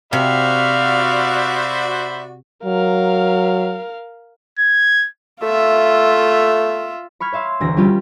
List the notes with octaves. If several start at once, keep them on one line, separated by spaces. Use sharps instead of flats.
C3 F#4 C5 D5 E5 F5 B5
F#3 A#4 F5
G#6
A3 F4 E5
B5 C#6 F6 G#6
C#5 E5 F5 C6
E1 D2 A#6
G3 C#4 F4 G4